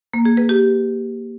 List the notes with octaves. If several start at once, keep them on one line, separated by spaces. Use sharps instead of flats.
A#3
G#4
B4
G4